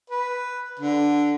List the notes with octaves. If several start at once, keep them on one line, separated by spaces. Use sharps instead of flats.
B4
D3